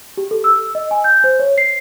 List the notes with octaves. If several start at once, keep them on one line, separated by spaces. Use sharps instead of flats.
G4
A4
E6
D#5
G#5
G6
C5
C#5
C7